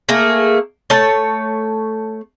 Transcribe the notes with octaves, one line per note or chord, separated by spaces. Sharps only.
A3 A#3 G#4
A3 C#5 A5